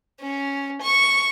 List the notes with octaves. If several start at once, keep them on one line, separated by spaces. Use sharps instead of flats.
C#4
C#6